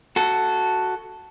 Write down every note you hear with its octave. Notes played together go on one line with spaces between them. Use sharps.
F#4 A4